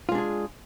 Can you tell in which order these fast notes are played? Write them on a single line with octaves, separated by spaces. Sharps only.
F4 G#3 D4 G#4